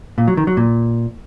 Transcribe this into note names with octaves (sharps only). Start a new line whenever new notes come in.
A#2
F#3
D#3
F#3
A#2